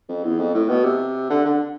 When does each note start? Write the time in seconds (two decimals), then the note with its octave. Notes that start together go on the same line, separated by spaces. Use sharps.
0.08 F2
0.23 E2
0.39 F2
0.54 A2
0.69 B2
0.84 C3
1.30 D3
1.45 D3